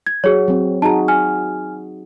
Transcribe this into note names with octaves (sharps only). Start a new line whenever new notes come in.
G#6
F#3 F#4 G#4 C#5
F#3 C4
D#4 F#4 G#4 A5 A#5
G#5 F6